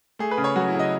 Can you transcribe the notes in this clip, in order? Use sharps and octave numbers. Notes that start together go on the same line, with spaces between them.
A3 G#4
B4
C#3
C#5
F#3 F#4
E4
C#3
D#5